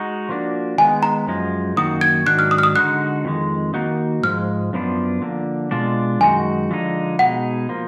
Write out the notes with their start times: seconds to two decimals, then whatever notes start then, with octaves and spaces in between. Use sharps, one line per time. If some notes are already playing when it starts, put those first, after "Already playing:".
Already playing: G#3 D#4 F#4
0.29 F3 A#3 D4 F#4
0.78 D#3 G#3 B3 G#5
1.03 A#5
1.27 F#2 F3 G#3
1.77 F#2 D#3 A#3 D#4 F#4 D#6
2.01 G#6
2.26 G#2 D#3 F#3 D4 F#4 F#6
2.39 F6
2.51 D#6
2.59 F6
2.63 D#6
2.76 D3 G#3 D#4 F#4 F#6
3.25 F2 D#3 G#3
3.74 D#3 A#3 D#4 F#4
4.23 G#2 F3 G#3 F6
4.73 F#2 F3 B3 D4 F4
5.22 D3 F3 A#3
5.71 B2 G#3 D4 F4
6.20 F#2 D#3 G#3 D#4 F#4 G#5
6.71 D3 F3 G#3 D#4
7.19 B2 G#3 D#4 F#5
7.69 F3 A#3